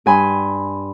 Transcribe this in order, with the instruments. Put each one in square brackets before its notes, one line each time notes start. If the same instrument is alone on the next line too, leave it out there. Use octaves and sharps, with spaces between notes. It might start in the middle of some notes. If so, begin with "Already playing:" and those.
[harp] G2 G#5 B5 C6